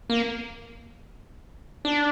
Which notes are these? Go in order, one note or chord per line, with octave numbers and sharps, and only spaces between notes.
A#3
D4